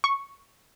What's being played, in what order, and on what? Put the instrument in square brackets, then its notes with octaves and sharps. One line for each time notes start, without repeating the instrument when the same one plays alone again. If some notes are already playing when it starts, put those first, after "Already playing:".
[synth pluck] C#6